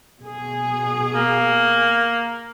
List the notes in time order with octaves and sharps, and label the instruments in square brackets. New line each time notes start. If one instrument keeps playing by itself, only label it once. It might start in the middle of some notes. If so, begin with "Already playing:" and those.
[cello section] B2 G#4
[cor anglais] A#3